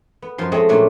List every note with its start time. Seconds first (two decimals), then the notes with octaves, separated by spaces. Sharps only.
0.22 B3
0.38 F#2 F3 C6
0.52 G#3 A3 C4 C#5 D#5
0.69 A#2 F#3 A3 C#4 D4